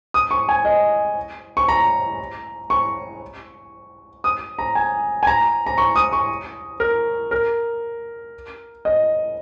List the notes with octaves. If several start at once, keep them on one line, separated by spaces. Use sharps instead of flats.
D#6
C#6
G#5
D#5
C#6
A#5
C#6
D#6
A#5
G#5
G#5
A#5
A#5
C#6
D#6
C#6
A#4
A#4
D#5